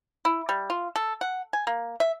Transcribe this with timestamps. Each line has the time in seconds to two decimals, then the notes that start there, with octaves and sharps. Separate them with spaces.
0.25 E4
0.49 G3
0.70 F4
0.96 A4
1.21 F#5
1.53 G#5
1.67 A#3
2.00 E5